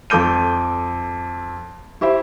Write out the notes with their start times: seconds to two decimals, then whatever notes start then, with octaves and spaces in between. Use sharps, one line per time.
0.10 F2 A4 D6 G6 D#7
2.01 E4 G4 C5 E5